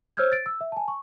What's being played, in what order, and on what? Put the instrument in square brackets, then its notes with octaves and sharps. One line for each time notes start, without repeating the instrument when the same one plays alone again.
[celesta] C5 C#5 E6 F6 G6 G#6
A6 D7
E6
E5
G#5 A5
C#6